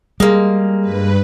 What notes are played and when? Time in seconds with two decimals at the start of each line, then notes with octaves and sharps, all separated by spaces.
0.20 G3 G#3 A#3
0.81 G2 B4